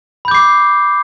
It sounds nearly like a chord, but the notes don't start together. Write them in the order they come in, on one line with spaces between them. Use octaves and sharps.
B5 G6 D6 C7